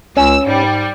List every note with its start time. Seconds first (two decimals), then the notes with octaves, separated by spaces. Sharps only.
0.17 C#2 C#4 E6
0.46 G#2 G3